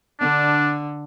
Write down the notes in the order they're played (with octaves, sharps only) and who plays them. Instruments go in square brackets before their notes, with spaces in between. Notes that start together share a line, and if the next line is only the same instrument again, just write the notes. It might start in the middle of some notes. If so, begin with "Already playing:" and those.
[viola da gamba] D3 [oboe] D4